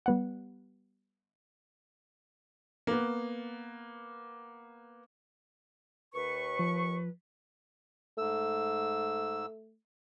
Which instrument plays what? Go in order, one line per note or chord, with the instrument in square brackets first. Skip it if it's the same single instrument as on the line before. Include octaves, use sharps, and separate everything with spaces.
[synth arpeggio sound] G3 B3 F#5
[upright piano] A#3 B3
[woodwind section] D#2 C#6 [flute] B4
[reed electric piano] F3
[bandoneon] G#2 E6 [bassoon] A3